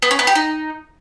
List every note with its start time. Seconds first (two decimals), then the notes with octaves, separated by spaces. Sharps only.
0.02 B3
0.11 C#4
0.19 B3
0.27 G4
0.35 D#4